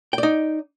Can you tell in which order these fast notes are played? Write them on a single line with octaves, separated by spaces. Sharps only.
G5 D5 D#4